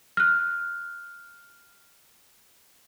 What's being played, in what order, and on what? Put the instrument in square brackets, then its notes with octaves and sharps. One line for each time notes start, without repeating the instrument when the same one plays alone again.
[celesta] F6 F#6